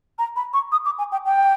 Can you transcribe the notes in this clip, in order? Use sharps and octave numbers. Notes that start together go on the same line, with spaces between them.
A#5
B5
C#6
D#6
D6
G#5
G5
G5